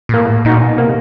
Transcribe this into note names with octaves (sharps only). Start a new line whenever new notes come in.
A#2
A2 A#3
A#2 D#4 F#4
B2
C3 A#3